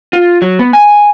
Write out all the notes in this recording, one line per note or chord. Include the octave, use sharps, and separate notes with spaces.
F4
F#3
B3
G#5